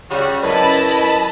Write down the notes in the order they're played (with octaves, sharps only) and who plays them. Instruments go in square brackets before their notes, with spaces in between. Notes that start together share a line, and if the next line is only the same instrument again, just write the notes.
[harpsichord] C#3 [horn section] G3 F#4
[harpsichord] F#2 [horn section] E4 B4 [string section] D#5 A5 B5